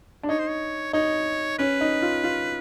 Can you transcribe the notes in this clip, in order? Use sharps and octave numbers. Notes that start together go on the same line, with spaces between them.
D4
D#4 C#5
C5
C#5
D#4 C#5
C#4 B4
D#4
F4
F4